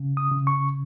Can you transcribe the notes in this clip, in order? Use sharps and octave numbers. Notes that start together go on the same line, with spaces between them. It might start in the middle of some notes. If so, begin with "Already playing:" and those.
Already playing: C#3
D#6
C#3
C#6